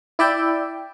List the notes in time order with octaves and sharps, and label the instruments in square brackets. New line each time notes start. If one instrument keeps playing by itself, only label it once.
[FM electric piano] E4 D5 E5 G5